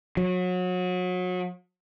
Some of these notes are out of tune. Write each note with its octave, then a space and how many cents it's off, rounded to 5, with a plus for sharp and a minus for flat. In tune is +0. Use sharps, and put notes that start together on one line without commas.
F#3 -30